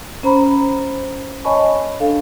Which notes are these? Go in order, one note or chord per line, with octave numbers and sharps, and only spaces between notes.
C#4 C5 A#5 B5
C#5 D#5 G#5 A5 B5 C#6
D4 A4 F5